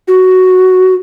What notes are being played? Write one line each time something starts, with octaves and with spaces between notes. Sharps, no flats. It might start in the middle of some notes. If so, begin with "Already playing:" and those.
F#4